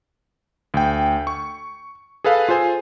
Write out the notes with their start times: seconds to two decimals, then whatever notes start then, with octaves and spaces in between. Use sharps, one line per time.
0.74 D2 G5
1.27 C#6
2.24 G#4 A4 B4 F5
2.49 F4 G#4 C5 G#5